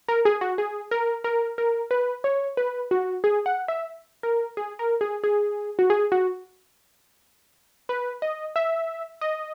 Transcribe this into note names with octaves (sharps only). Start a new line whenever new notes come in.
A#4
G#4
F#4
G#4
A#4
A#4
A#4
B4
C#5
B4
F#4
G#4
F#5
E5
A#4
G#4
A#4
G#4
G#4
F#4
G#4
F#4
B4
D#5
E5
D#5